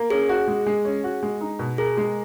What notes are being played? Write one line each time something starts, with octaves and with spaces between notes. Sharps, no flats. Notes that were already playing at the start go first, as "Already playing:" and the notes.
Already playing: A#3
C#4 G#4
F#4
G#3
G#3
C#4
F#4
G#3
D#4
B2
G#4 A#4
G#3